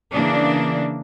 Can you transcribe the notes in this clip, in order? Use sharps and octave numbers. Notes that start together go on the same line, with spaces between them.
C#3 E3 A#3 D4